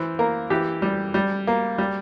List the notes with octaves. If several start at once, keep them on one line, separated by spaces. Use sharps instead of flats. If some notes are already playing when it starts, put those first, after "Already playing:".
Already playing: E3 C5
A#3 A#4
E3 G4
G3
G3
A#3
G3